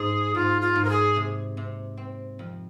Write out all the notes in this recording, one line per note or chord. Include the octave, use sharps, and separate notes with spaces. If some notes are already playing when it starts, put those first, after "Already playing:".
Already playing: G#2 G#4
G#2 F4
F4
G#2
A#4
G#4
C3
C3
C4
F2